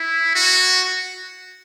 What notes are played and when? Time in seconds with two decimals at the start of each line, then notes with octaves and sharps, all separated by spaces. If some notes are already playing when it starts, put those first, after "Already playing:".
Already playing: E4
0.35 F#4